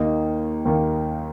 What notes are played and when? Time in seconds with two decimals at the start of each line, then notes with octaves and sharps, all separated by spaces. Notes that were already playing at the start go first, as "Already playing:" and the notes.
Already playing: D#2 D#3 A#3 D#4
0.65 D#2 D#3 A#3